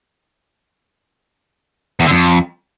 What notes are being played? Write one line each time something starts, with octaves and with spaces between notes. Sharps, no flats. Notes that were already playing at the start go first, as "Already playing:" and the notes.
E2
D3
F2